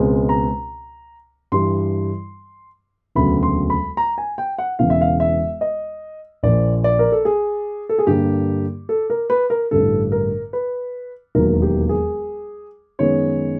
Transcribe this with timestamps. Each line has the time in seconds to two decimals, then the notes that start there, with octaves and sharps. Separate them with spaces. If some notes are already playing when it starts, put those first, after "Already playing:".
Already playing: C#2 B2 G#3 C4
0.29 A#5
1.52 G2 E3 G3 C6
3.15 E1 D2 C#3 F#3 B3 B5
3.43 C6
3.70 B5
3.97 A#5
4.18 G#5
4.38 G5
4.58 F#5
4.79 E1 E2 C#3 E3 F5
4.90 E5
5.01 F5
5.20 E5
5.61 D#5
6.43 A#1 A#2 F3 D5
6.84 D5
6.99 A#4
7.12 A4
7.25 G#4
7.89 A4
7.99 G#4
8.07 G2 D3 G3 A#3 G4
8.89 A4
9.10 A#4
9.30 B4
9.50 A#4
9.71 A1 G2 D3 A4
10.12 A#4
10.53 B4
11.35 E1 D#2 D#3 F#3 A#4
11.62 G4
11.89 G#4
12.99 F#2 D#3 G#3 B3 C#5